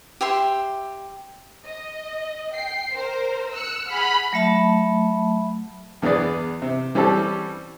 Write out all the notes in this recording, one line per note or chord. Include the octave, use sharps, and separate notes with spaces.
G4 E5 G5 C6
D#5
G5 C7
A#4 C5
E6 F#6 C#7
G#4 F#5 B5 F6
F#3 A3 E5 A5 B5
E2 E3 B3 G#4 D5
C3
E3 G3 C4 C#4 G4 A4